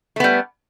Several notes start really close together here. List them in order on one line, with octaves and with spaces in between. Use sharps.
A3 B3 G3